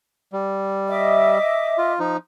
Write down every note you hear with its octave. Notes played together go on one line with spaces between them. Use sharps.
G3
D#5 E5 D6
F4
F3 D#4